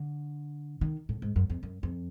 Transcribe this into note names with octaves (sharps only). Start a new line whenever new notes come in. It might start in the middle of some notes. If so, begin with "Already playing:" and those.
Already playing: D3
D#3
A2
G#2
F#2
F2
F#2
F2